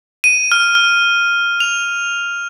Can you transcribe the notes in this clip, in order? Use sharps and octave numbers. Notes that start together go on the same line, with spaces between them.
D#7
F6
F6
F7